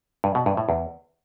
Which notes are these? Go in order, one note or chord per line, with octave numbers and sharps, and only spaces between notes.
G2
B2
G2
A2
E2